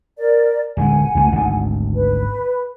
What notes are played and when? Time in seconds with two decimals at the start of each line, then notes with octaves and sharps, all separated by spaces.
0.17 A#4 D5
0.77 D1 D3 G#3 F#5 G#5
1.15 C#2 F#3 A3
1.32 G#1 D2
1.94 B4